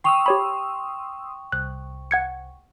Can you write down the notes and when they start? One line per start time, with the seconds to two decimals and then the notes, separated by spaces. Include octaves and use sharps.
0.04 G5 C6 C#6 D#6 E6 F7
0.26 G4 C#5 B5
1.52 C2 F#6
2.11 F#5 G#6 C#7